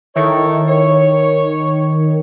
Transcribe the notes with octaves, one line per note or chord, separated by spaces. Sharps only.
D#3 E4 A4 C#5
C#5